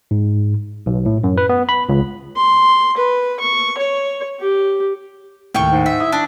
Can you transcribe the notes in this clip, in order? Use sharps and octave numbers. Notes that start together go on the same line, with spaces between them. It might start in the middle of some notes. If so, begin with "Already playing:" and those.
G#2
B1
A2
F#2
B4
B3
B5
C#2
C6
B4
C#6
C#5
G4
D#2 A2 G5 C#6
G#2
E5
E4 D#6
D4